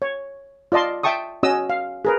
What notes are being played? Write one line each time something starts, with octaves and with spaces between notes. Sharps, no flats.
C#5
F4 D5 D#5 A5 C6
E5 G5 A5 C#6 D#6
C#4 F#4 D#5 D#6 E6
F5
G#4 A#4 B4